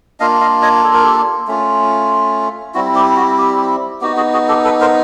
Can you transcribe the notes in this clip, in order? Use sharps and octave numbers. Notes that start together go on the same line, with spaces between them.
A#3 D4 F4 D#5 F5
D#5 F5
C#5 D#5
A4
A#4
G4 A4
A3 C#4 F4
G3 C4 E4 F#4
G4
F#4
G4
B3 D#4 F#4 G4
F#4 G#4
F#4 G#4
G4 A4
A4 B4
A#4 C5